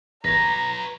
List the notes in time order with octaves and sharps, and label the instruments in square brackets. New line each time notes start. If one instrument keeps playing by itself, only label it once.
[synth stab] G1 E2 [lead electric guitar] B4 C#5 [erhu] A#5 [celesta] A#6